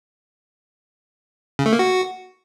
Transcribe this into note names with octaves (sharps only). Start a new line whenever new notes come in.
C#3
A3
A#3
F#4